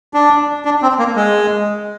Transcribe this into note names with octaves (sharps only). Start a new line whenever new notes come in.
D4
D4
C4
A#3
G#3